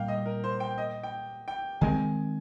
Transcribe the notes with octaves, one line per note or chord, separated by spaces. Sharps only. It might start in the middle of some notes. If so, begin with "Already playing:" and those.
Already playing: A#2 G3 A#3 F5 G5
D#5
A#4
C5
G5
D#5
G5
G5
D#3 G#3 C4 G#5